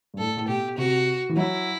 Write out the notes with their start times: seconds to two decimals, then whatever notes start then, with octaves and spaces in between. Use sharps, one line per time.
0.14 G2
0.18 A2 A4
0.37 A2
0.48 B2 G4
0.77 C3 F#4
1.29 E3
1.37 F#3 E4